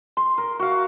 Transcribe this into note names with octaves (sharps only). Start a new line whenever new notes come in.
C6
A#4
F#4 F5